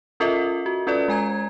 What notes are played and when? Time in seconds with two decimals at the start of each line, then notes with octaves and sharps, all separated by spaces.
0.20 C#4 F4 A4 A#4 D#5 E5
0.66 F#4
0.87 C#4 F4 A4 B4 D5
1.08 G#3 G#5 A#5 G#6